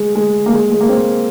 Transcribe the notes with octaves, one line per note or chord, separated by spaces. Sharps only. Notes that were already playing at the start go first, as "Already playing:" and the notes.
Already playing: G#3
G#3
A#3
G#3
G#3
A#3
C4